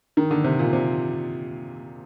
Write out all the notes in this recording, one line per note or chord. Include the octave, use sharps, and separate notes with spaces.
D#3
D3
C3
A#2
C3